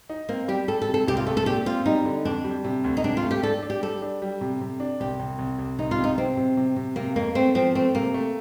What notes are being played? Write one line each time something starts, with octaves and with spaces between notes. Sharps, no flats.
D#4
A#3 C4
G3 G4
G3 A4
A4
C3
A4
C2 G4
F4
A3 A4
A4
A#2 G4
C4 F4
G3 D#4
D3
F2 D4
G3
C3
D2
D#4
C3 D4
F4
A3
G4
D4 A4
D4
G4
G3 A4
D4
G3
C3
C3
D4
C2 G4
C2
C2
C2
C2 D#4
F4
C3
D#4
C3 C4
C3
C3
C3
C3 A#3
F2 A#3
A3 C4
F3 C4
A3 C4
C3 A#3
A3